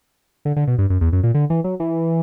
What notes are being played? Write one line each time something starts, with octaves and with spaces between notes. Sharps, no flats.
D3
D3
B2
G2
F#2
E2
F#2
A#2
D3
E3
F#3
E3